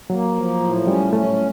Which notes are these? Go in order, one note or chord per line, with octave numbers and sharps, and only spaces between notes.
F#3 A#3
F3
A2
G3 C#4
A3 C#4